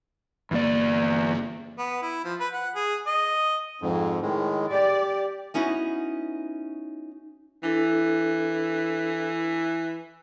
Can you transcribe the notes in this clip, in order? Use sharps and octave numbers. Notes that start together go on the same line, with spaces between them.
G1 E2 A#3 D5
B3
E4
F3
B4
F#5
G#4
D#5
F2 G#2
A2 D#3 G#3
G4 D5
B3 C#4 D#4 E4 F#4
E3 D4 E4 A4